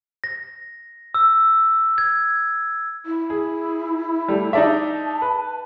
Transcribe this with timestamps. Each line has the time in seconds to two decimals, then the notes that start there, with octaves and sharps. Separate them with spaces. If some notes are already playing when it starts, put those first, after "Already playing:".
0.24 A#6
1.14 E6
1.98 G#6
3.06 E4
3.30 G#4
4.28 G3 A3
4.53 D#4 D5 E5 A5
5.22 B4